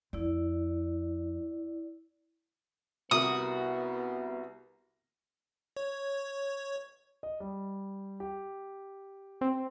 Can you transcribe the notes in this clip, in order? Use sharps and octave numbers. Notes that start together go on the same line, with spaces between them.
F2 E4 D5
C2 B3 F#4 A#4 D#6
C#5
D#5
G3
G4
C4